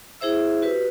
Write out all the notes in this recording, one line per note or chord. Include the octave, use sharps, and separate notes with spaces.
E4 G#4 C5 E5 E6
F#4 G4 B4